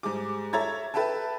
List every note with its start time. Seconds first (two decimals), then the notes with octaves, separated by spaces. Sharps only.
0.03 G#2 G3 G#4 D6
0.53 A4 C#5 E5 A#5 G#6 A6
0.94 A4 B4 E5 G5 A5